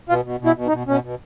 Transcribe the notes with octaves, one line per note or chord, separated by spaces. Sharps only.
B2 F4
B2
B2
E4
B2
D#4
B2
B2 C#4
B2